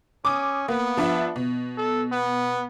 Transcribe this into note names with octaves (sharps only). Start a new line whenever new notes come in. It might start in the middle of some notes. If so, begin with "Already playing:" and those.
C#4 D6 D#6
A#3 B3
F3 D4 E5
B2
A4
B3